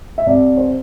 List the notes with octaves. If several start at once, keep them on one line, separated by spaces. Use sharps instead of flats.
E5
C2 D5
C5